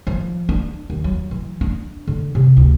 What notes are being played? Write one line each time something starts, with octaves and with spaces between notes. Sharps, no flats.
F3
D4
D#2
F#3
E3
D4
D3
C3
D2